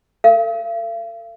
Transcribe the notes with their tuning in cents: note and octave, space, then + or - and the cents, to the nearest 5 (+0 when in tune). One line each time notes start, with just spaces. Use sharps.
A4 +40 F5 -45